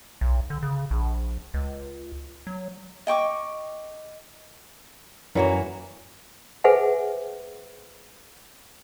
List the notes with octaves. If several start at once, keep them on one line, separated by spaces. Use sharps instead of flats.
B1
D3
C#3
A#1
C#2
F#3
D#5 G5 C#6 D6
F#2 E3 F#3 A#3 A#4 C#5
G#4 B4 C5 E5 F#5 G#5